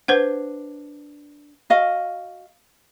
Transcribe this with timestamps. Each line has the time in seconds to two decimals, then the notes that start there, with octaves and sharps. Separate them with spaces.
0.08 D4 B4 C5 F#5
1.70 F#4 D#5 F5